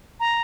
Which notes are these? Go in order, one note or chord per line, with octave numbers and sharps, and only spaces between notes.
A#5